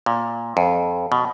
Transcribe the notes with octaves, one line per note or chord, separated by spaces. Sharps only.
A#2
F2
B2